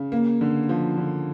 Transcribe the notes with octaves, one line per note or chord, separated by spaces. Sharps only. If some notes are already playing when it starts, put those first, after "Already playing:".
Already playing: C#3
A#3
D3
F3
D3